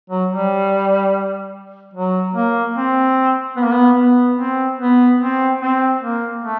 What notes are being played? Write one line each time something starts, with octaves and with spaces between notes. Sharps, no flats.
F#3
G3
F#3
A#3
C4
B3
A#3
B3
B3
C4
B3
C4
C4
A#3
A3